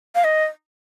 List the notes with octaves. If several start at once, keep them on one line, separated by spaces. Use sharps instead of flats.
F5
D#5